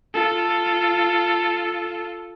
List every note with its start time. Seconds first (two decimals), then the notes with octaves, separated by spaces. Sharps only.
0.14 F4 A4